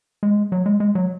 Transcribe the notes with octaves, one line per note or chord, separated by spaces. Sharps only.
G#3
F#3
G#3
G#3
F#3